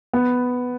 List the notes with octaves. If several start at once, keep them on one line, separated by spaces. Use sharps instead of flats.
B3